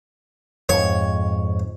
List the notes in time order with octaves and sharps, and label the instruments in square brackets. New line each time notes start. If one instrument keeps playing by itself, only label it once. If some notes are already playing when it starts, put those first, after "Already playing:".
[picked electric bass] F2 G#2 [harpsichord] C#5